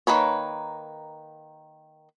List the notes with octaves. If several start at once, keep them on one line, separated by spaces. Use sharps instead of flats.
D#3 A#3 B4 C#5